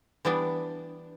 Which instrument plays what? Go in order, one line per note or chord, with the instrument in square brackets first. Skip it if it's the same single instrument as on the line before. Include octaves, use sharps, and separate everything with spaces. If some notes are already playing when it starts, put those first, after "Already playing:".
[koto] E3 G3 B3 D4